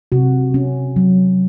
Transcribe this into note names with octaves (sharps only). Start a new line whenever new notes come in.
C3 F#4
C#4
F#3